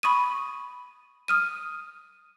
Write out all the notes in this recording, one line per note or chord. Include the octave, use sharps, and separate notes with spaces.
B5 C#6 D#6 D#7
D#6 F6 D#7